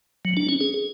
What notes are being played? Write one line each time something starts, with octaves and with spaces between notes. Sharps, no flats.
F#3
D4
C#4
G#4